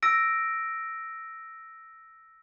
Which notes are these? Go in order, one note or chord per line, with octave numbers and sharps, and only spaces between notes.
E6 A#6 D7